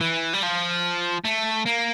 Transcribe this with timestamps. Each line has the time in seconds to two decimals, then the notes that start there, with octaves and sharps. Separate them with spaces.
0.01 E3
0.34 G3
0.43 F3
1.24 A3
1.66 A#3